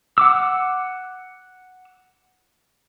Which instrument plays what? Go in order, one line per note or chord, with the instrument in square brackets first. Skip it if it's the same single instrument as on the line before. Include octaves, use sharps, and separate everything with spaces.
[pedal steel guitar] F#5 D6 E6